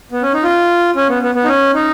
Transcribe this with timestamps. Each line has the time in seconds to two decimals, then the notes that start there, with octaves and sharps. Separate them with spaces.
0.12 B3
0.22 C#4
0.33 D#4
0.43 F4
0.96 C#4
1.09 B3
1.23 B3
1.35 B3
1.44 D#4
1.48 C#4
1.74 D#4